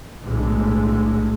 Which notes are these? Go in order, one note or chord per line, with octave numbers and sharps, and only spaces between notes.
B1 A2 D3 G#3